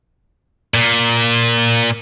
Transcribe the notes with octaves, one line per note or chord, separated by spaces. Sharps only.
A#2